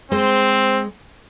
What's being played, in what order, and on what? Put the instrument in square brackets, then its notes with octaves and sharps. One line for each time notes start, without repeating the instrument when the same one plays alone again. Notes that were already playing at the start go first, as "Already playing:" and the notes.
[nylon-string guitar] G#3 C5 [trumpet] C4